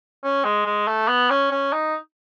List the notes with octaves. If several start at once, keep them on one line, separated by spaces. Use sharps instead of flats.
C#4
G#3
G#3
A3
B3
C#4
C#4
D#4